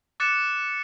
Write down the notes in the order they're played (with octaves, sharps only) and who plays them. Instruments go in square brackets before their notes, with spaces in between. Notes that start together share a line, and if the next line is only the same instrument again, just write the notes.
[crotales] D6 F#6 A6 C#7 E7